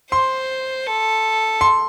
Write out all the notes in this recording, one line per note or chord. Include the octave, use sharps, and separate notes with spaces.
C5 C6
A4
C6